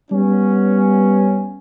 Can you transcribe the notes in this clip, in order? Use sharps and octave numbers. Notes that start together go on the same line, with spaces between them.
G3 B3 C#4